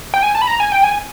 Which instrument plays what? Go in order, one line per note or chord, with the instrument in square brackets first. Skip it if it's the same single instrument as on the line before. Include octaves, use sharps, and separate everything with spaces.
[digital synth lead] G5
G#5
A5
B5
A#5
G#5
G5
G#5